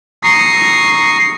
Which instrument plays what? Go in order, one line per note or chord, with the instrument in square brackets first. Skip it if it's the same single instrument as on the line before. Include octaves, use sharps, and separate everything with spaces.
[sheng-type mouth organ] A#5 C#6 D#6 [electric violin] C7